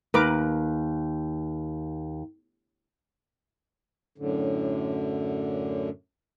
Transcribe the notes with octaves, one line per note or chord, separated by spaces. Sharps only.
D#2 A#4 B4 D6
F#2 A2 D3